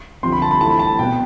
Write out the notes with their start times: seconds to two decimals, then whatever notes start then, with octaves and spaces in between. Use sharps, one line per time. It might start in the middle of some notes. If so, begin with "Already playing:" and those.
0.23 D3 F3 C4 C6
0.32 B5
0.42 A5
0.51 B5
0.61 E3 A3 C4 A5
0.70 B5
0.79 A5
0.99 B2 B3 G5